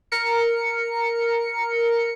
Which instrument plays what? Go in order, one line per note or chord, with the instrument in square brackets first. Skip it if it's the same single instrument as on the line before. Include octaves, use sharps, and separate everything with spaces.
[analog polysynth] A#4 C#7